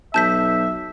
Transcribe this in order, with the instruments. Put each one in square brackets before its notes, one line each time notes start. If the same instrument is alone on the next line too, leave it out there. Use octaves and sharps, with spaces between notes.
[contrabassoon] B1 [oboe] E5 [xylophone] A5 G6 B6